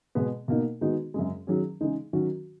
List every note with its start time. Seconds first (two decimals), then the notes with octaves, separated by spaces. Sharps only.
0.15 B2 G#3 B3
0.48 B2 A#3 D#4
0.81 D#3 G#3 B3 D#4 F#4
1.14 F#2 C#3 G#3
1.47 D#3 F#3 C#4 G#4
1.81 C#3 E3 G#3 D#4
2.13 D#3 F#3 C#4 F#4